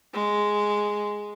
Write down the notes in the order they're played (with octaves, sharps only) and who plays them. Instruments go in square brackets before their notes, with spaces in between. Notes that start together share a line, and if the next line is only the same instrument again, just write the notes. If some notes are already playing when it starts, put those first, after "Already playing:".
[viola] G#3